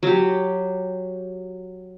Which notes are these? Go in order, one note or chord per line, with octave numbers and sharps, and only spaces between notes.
F#3 G4